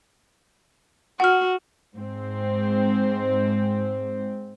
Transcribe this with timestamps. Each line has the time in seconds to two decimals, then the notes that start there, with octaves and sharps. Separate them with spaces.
1.20 F#4 F#5 F6
1.94 G#2 C4